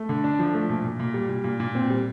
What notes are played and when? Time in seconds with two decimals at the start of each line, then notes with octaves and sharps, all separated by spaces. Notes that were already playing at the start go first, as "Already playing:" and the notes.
Already playing: A3
0.09 D3
0.24 D4
0.39 F3
0.54 A3
0.69 A#2
0.84 A#2
1.00 A#2
1.14 G3
1.29 A#2
1.44 A#2
1.60 A#2
1.75 C4
1.90 G3